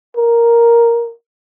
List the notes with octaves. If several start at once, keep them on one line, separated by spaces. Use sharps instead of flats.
A#4